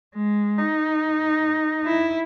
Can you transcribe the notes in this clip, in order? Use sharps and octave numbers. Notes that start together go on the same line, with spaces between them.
G#3
D#4
E4